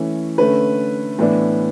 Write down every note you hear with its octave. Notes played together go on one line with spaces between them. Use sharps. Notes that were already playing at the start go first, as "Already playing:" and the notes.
Already playing: E3 A3 C#4
D3 A3 C#4 B4
A2 E3 B3 D4